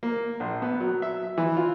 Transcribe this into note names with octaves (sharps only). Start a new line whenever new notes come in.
A#3
A#1
B3
F#3
E5
E3
F4